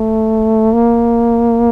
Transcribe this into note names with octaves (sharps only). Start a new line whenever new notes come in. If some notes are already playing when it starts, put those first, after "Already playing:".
Already playing: A3
A#3